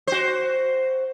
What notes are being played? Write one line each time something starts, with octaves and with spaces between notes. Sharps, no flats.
F#4 C5